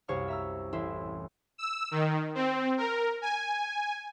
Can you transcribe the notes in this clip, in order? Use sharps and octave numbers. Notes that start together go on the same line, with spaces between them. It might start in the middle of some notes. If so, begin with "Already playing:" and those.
C2 F#2 C#5 F5 C#6 F6
E5 A#5 E6
A1 E4 E5 C6
E6
D#3
C4
A#4
G#5